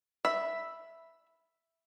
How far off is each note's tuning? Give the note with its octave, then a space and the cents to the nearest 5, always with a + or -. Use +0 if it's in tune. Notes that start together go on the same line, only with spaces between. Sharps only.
E5 +0 B5 +0